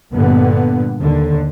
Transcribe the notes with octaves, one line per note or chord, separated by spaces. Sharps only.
G2 A#2 D3 B3
D#2 D3